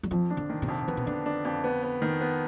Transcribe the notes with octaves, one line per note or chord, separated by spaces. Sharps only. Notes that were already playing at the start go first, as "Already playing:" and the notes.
G3
F2 F3
D4
D3
D#3
C3
F2
D3 B3
C3
D3 D4
D4
F2
B3
B3
D#3
B3